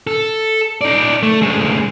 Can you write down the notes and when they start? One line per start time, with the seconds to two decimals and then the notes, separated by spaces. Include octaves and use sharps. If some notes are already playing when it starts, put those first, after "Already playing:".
0.07 A4
0.81 D#4 D5
1.23 A3
1.41 D2 G#3